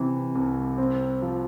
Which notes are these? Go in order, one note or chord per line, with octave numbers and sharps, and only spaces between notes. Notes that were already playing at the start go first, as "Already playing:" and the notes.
Already playing: C3 E3
C2
C4
F3